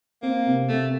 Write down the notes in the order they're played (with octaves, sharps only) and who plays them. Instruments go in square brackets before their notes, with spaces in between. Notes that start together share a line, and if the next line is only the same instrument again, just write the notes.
[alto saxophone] A#3 [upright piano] C4
[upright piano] C3
[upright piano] C3 [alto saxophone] A3